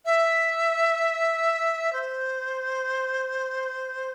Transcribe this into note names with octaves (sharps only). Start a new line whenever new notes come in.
E5
C5